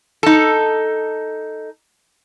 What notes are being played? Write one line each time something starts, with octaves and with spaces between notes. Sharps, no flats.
D#4 A4